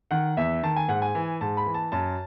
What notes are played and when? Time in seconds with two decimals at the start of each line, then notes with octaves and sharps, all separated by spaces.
0.11 D#3 F#5
0.37 E2 E5
0.63 D#3 A5
0.76 G#5
0.88 G#2 F#5
1.02 G#5
1.15 E3
1.41 G#2 A5
1.57 B5
1.66 E3
1.74 A5
1.92 F#2 A5